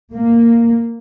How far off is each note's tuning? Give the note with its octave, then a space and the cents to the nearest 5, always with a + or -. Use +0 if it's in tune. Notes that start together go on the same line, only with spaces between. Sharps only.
A#3 -5